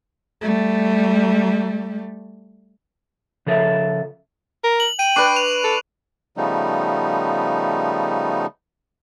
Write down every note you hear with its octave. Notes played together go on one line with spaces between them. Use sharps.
G3 A3
C#3 F3 A4 D#5 E5
A#4
F#7
G5 D#7
D4 B4 C#6 C7 D7
F7
A4
C#3 F3 G3 A3 B3 D#4